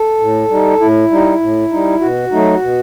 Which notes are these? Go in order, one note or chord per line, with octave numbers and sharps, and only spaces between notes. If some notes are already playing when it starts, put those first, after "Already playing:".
Already playing: A4
A2
G3 D#4
A2 E4
G3 D#4
A2
G3 D#4
B2 F#4
F#3 A3 D#4
B2